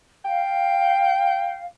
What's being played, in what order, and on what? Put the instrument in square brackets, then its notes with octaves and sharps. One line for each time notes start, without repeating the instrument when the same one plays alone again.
[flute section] F5 [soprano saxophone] G5